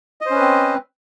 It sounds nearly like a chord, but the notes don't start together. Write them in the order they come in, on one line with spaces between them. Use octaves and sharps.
D#5 C5 C#4 B4 C4